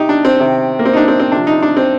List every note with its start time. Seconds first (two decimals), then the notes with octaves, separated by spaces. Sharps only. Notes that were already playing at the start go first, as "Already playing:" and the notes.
Already playing: C3 D#4 G4
0.09 D4
0.25 C4
0.40 C3 D#3
0.79 A#3
0.86 C4
0.93 D#4
0.97 D4
1.08 C4
1.19 C4
1.32 C3 F3 D4
1.47 D#4
1.63 D4
1.77 C4